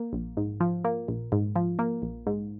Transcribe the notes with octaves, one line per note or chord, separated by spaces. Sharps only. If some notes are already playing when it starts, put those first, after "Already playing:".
Already playing: A#3
A#1
G#2
F3
A#3
A#1
G#2
F3
A#3
A#1
G#2